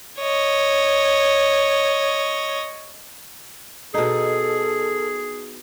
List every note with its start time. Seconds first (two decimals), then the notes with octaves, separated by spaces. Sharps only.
0.20 C#5 D#5
3.94 B2 D#4 G#4 A4